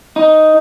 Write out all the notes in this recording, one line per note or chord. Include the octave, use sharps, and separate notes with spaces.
D#4